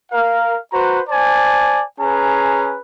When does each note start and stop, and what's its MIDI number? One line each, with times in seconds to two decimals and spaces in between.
0.12 0.58 70
0.12 0.58 77
0.72 1.00 66
0.72 1.00 71
0.72 1.00 72
0.72 1.00 82
1.09 1.83 72
1.09 1.83 74
1.09 1.83 80
1.09 1.83 81
2.00 2.77 61
2.00 2.77 68
2.00 2.77 71
2.00 2.77 82